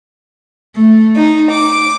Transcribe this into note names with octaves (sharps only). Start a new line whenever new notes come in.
A3
D#4
D6